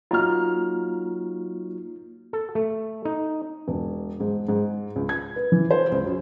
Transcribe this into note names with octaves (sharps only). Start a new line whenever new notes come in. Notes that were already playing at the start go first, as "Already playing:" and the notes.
F#3 A#3 D#4 F4 F#4 A#5 F6
A4
A3
D#4
E1
G#2
G#2
C#2
G#6
B4
E3
C5
C#2
F#2